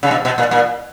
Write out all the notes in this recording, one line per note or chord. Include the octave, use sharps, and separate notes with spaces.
C#3
B2
B2
A#2
A#2